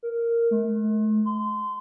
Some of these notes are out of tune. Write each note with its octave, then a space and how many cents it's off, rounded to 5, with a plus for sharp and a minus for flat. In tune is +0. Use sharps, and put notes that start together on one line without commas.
A#4 -5
A3 -45
C6 -25